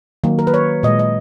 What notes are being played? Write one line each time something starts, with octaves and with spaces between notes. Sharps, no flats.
D#3 F#3 A#3
A#4
B4
C#5
A#2 G#3 D#5
D#5